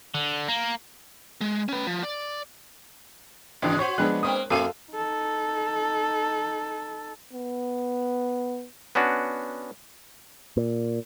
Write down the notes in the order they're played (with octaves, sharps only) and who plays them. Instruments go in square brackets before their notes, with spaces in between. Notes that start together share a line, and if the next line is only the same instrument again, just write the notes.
[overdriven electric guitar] D3
A#3
[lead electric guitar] G#3
C#4 B4
F3
D5
[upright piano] G#1 D4 [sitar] C#3 E3 G#3
[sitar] F#4 C5 C#5 [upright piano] C#6
[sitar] F3 [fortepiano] G#3 B3 D4 [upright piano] F#6
[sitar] A#3 C4 [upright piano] D#6
[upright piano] F#2 D#7 [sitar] A#3 [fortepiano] A4 F5
[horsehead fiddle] D#4 A4
[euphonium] B3
[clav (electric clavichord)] B3 C#4 D4 F#4
[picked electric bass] A#2